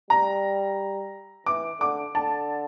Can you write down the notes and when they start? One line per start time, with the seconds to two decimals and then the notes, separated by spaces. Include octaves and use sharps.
0.10 G3 A#5
1.46 E3 D6
1.80 D3 D6
2.14 D3 A5